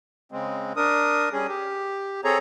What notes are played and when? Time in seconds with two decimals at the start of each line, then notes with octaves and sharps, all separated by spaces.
0.32 C#3 G#3 C4
0.76 D4 A#4 D#6
1.33 G3 C#4 G#4
1.48 G4
2.24 C4 G#4 A4 C#5 A#5